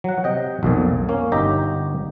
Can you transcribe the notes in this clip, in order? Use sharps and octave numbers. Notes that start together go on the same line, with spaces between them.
F#3 F#5
C3 D#5 G5
B1 F2 A#2
A#3 C#4
G1 D#4 G4 E5 A#5